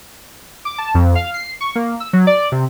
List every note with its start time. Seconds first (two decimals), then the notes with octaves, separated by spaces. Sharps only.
0.65 D6
0.78 A5
0.95 F2
1.15 F5
1.34 C7
1.61 C#6
1.75 A#3
2.00 E6
2.13 F#3
2.27 D5
2.52 C3